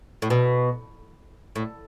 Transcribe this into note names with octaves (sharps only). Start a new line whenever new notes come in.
A2
B2
A2